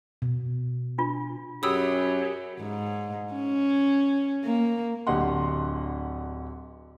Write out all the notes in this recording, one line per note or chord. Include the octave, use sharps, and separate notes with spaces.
B2
D4 F4
F#2 F#3 G4 G#4 B5 D#6 E6
G#2
C#4
A#3
D1 D3 G4 D#5 F#5 C6